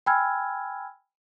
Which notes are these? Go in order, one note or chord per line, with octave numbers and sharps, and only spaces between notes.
G5 G#5 B5 E6 F6 G#6